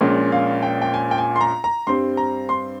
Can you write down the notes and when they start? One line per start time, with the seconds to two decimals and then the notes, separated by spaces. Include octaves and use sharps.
0.01 A#1 A#2 G#3 C#4
0.32 F5
0.63 G5
0.82 G5
0.94 G#5
1.11 G5
1.18 G#5
1.36 C6
1.41 A#5
1.64 A#5
1.87 G2 G3 C4 C6
2.17 A#5
2.49 C6